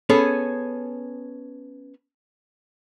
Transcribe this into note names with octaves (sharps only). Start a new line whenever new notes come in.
B3 C#4 G#4 A4